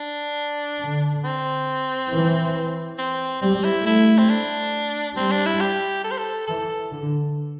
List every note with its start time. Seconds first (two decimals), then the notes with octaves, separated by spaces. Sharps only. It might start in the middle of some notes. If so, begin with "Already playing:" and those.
Already playing: D4
0.79 D3
1.24 C4
2.11 E3
2.98 C4
3.41 G3 C4
3.64 E4
3.85 A3 E4
4.18 C4
4.29 D4
5.17 G3 C4
5.31 D4
5.46 E4
5.61 G4
6.04 A4
6.11 C5
6.18 A4
6.47 E3 A4
6.91 D3